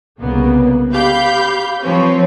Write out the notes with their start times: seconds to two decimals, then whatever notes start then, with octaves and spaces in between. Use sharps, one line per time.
0.20 C2 C#3 A#3 B3
0.91 G4 F5 B5 G6
1.81 F3 C4 B4 C#5